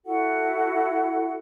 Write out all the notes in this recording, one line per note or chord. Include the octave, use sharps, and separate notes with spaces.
E4 F#4 A4 F#5